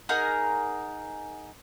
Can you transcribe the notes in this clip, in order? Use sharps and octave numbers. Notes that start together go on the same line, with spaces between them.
D#4 G#4 A#4 F#5